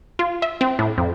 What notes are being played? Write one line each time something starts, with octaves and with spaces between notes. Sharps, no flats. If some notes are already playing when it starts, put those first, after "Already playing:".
F4
E5
C4
A2
F2